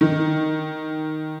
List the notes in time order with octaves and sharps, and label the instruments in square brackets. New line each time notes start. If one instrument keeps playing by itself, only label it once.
[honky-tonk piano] D#3